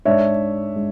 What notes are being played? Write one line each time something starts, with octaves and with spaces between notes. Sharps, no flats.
G#2 G#3 D4 C#5 E5
G#3 D4